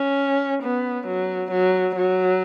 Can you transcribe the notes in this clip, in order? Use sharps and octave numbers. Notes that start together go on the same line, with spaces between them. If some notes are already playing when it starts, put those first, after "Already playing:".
Already playing: C#4
B3
F#3
F#3
F#3